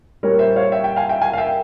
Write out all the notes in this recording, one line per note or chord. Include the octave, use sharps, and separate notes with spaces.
A#2 G3 A#3 A#4 C#5
C5 E5
C#5 F5
E5 G5
E5 G5
F5 G#5
E5 G5
F5 G#5
F5
E5 G5